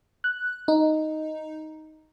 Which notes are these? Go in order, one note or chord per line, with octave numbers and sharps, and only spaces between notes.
F#6
D#4